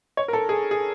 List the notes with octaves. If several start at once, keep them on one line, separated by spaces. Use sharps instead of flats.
C#5
A#4
A4
G#4
G#4